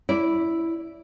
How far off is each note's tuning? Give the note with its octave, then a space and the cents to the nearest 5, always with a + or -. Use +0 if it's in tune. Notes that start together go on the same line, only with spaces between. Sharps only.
E4 +0 D5 -10